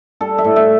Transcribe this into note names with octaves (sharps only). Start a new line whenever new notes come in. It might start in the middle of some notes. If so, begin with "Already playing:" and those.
G3 A4
E5
A2
E5